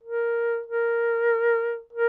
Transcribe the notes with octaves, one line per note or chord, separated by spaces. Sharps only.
A#4
A#4
A#4